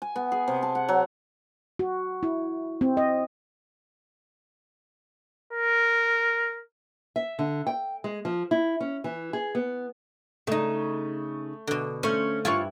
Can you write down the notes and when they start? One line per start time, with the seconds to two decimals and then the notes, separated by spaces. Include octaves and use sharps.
0.02 G#5
0.16 B3
0.32 G#4
0.48 C3
0.63 A5
0.75 F#5
0.88 F#3
1.79 F#4
2.23 E4
2.81 C4
2.97 D#5
5.53 A#4
7.16 E5
7.39 D3
7.67 G5
8.04 G#3
8.25 F3
8.51 E4
8.81 C#4
9.04 E3
9.33 G#4
9.55 B3
10.47 C#3 A3 D#4
11.67 B2 D3
12.03 A3 C#4 C5 F5
12.45 G2 E4 F4 C#5 G#5